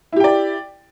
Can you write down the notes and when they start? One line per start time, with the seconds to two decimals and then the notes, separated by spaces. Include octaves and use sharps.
0.12 E4
0.16 G4
0.20 G5
0.24 D5